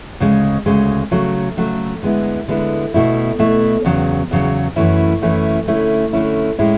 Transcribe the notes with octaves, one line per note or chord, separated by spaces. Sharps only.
D2 C#3 G#3
D2 C#3 G#3
C#3 F#3 A3
C#3 F#3 A3
D3 G#3 B3 E4
D3 G#3 B3 E4
B2 A3 E4
B2 A3 E4
E2 C#3 F#3
E2 C#3 F#3
F#2 E3 A3 C#4 E4
F#2 E3 A3 C#4 E4
D3 A3 C#4 E4
D3 A3 C#4 E4
A2 G#3 C#4 E4